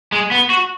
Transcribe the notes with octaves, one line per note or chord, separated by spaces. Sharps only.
G#3
B3
F#4